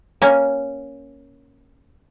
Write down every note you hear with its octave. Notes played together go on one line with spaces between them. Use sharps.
A#3 C#4